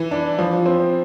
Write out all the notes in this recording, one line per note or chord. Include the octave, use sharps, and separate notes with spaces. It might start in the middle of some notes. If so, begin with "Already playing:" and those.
Already playing: E3
D4
F3
C4